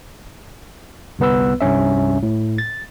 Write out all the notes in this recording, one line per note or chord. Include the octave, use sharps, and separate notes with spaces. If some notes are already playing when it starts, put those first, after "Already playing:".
G1 C2 B3 B4 E6
C2 G2 C#4 E5
A2
A6